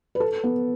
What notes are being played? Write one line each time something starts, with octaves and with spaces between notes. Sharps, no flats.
B4
A4
B3